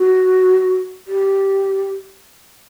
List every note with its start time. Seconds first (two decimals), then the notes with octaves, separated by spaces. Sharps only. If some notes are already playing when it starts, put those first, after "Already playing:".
Already playing: F#4
1.07 G4